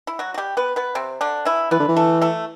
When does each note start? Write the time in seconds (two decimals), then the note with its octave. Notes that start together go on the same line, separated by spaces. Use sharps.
0.07 E4
0.19 F#3 F#4
0.34 F#4
0.38 G3 G4
0.57 B3 B4
0.76 B3 B4
0.95 C3 C4
1.21 D3 D4
1.45 E3 E4
1.71 E3 B3 B4
1.80 D3
1.89 E3
1.97 A3 A4
2.21 A3 A4